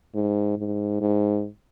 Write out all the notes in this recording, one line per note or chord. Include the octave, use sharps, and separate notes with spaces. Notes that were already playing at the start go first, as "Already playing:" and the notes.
G#2
G#2
G#2